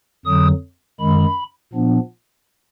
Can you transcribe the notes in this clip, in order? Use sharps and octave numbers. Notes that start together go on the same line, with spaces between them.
F2 D3 F#3 D#6
F#2 D#3 G#3 B5
A#2 F3 B3 D4